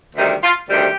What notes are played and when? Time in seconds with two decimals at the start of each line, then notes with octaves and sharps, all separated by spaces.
0.16 D2 C3 D#3 G3 D#4
0.43 F4
0.69 D2 C3 D#3 G3 G4